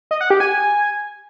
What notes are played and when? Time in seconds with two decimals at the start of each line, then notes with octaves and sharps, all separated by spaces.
0.11 D#5
0.21 F#5
0.30 G4
0.40 G#5